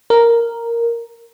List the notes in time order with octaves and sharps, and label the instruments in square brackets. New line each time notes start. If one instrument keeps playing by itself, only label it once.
[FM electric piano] A#4